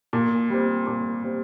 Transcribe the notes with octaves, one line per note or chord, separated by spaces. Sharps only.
A#2
G3 C4
A#2
G3 C4